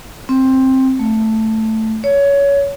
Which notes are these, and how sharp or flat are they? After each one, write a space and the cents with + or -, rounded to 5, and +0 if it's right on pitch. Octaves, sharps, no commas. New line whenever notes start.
C4 +10
A3 +5
C#5 +20